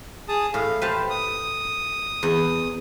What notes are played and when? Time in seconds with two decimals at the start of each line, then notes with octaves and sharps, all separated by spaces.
0.28 G#4 A5 D#6
0.54 A2 F5
0.82 G4 B4 C5 F5 A5
1.10 D#6
2.23 E2